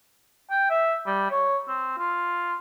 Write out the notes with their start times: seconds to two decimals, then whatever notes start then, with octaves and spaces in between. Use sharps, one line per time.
0.51 G5
0.70 E5
1.07 G3
1.31 C#5
1.68 C4
1.98 F4